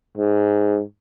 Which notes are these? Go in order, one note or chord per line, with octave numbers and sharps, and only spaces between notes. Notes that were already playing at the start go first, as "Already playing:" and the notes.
G#2